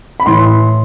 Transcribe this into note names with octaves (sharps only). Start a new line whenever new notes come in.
B5
A2 E3 C6